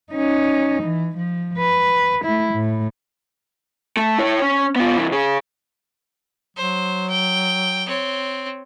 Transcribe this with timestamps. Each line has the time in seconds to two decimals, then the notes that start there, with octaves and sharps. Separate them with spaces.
0.13 C#4 D#4
0.83 E3
1.17 F3
1.58 B4
2.25 A3 E4
2.54 A2
3.97 A3
4.18 E4 C#5
4.42 C#4
4.76 B3 F4
4.96 C3 E3
5.11 C#3 G#4
6.57 F#3 C5
7.10 G5
7.86 C4 C#5